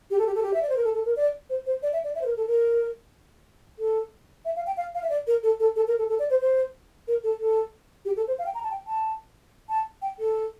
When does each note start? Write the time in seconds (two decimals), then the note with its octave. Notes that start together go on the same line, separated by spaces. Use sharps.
0.11 G4
0.19 A4
0.27 G4
0.35 A4
0.43 G4
0.54 E5
0.62 D5
0.69 C5
0.77 A#4
0.84 A4
0.95 A4
1.05 A#4
1.16 D5
1.50 C5
1.66 C5
1.83 D5
1.93 E5
2.04 D5
2.15 E5
2.21 C5
2.26 A#4
2.37 A4
2.48 A#4
3.79 A4
4.45 E5
4.56 F5
4.67 G5
4.77 F5
4.95 F5
5.03 E5
5.10 D5
5.27 A#4
5.43 A4
5.60 A4
5.76 A4
5.87 A#4
5.98 A4
6.09 A4
6.19 D5
6.30 C5
6.41 C5
7.08 A#4
7.24 A4
7.39 A4
8.05 G4
8.17 A4
8.28 C5
8.39 F5
8.46 G5
8.54 A#5
8.63 A5
8.71 G5
8.87 A5
9.69 A5
10.02 G5
10.19 A4